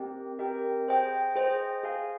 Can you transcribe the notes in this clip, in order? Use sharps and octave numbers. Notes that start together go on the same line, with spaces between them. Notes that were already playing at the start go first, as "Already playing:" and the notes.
Already playing: C4 G4 A#4 D#5 G5
C4 G4 A#4 D#5 G5
G#4 C5 D#5 G5
G#4 C5 D#5 G5
G#4 C5 F5 G#5